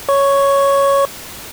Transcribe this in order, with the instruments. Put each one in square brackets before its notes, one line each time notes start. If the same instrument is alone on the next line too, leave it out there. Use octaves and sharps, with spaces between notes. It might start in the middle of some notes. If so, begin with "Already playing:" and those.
[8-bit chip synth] C#5 C#6